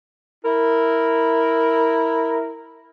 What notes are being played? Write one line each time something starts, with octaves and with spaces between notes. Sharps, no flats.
E4 A#4